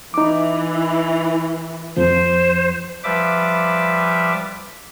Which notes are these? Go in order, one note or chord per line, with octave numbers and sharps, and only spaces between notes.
E3 D#4 D6
F2 F3 C5
F3 G3 B4 E5 D6